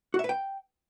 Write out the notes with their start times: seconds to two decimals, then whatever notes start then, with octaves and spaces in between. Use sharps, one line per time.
0.14 F#4
0.19 E5
0.24 B4
0.29 G5